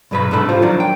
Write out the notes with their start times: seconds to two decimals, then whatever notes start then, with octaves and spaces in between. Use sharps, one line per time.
0.11 G2 B2 F#3 B4 C#5 B5
0.31 C2 G#2 D4 A4 B5
0.49 G3 F4 C5 F5
0.62 D#3 F3 F#3 A#3 D4
0.80 G5